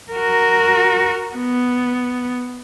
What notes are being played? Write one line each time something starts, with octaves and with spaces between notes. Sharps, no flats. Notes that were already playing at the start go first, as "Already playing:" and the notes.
F#4 A#4
B3